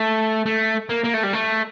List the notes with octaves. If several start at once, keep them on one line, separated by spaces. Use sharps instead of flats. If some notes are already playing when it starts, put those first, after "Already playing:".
Already playing: A3
A3
A#3
A#3
A3
G3
A3